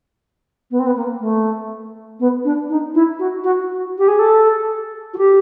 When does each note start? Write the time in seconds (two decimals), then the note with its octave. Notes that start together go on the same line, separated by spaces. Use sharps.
0.71 B3
0.79 C4
0.86 B3
0.96 A#3
1.20 A3
2.20 B3
2.45 D4
2.70 D#4
2.95 E4
3.19 F#4
3.44 F#4
3.98 G4
4.08 G#4
4.19 A4
5.14 F#4
5.18 G4